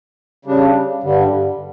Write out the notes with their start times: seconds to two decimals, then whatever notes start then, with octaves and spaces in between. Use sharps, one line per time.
0.45 C#3 G3 D4
1.03 G2 D3 G3